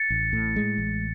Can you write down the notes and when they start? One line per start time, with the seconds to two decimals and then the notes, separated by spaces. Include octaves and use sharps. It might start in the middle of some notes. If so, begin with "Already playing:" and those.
Already playing: A6 C#7
0.10 A1
0.33 A2
0.56 G#3
0.78 A1